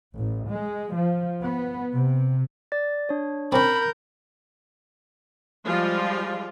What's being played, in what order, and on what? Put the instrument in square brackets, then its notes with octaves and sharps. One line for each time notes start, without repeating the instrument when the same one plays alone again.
[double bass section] A1
G#3
F3
B3
C3
[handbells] D5 A6
D4 C#5
[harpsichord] C4 C#4 [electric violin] A#4 G6 [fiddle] B5
[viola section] F3 G3 G#3 F4